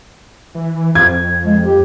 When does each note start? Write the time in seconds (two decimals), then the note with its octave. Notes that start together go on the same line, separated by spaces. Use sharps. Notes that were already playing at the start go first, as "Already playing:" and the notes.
0.55 E3
0.95 F2 G#6
1.45 G#3
1.65 G4